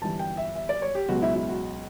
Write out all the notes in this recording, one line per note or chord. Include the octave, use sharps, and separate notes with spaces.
G1 G2 E3 A5
G5
E5
E5
D5
C#5
G4
C#2 B2 F#3 B3 F#4
E4
E4
F#4